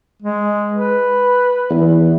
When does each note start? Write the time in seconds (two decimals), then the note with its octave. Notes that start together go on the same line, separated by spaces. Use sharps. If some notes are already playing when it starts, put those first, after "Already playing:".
0.22 G#3
0.72 B4
1.70 E2